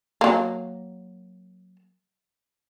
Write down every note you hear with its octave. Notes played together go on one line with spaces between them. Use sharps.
F#3 A#3